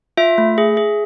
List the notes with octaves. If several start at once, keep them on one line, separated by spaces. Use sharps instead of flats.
F4 E5
A3
G#4
G#4